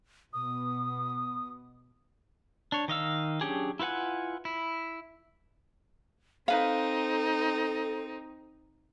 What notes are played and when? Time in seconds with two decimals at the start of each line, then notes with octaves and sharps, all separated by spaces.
0.33 B2 B3 D#6
2.72 D4 C#5
2.88 D#3 D#5 F5 E6
3.41 F#3 C#4 D4 G4 G#4
3.80 E4 F4 B4 F#5 G#5
4.45 E4
6.48 C4 D#4 A4 B4 F5